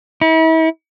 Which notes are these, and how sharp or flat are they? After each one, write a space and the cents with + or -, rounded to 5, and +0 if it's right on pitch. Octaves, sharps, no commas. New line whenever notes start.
E4 -40